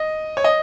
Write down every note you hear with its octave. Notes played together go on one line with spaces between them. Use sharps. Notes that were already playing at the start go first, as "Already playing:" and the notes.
Already playing: D#5
C#5
D#5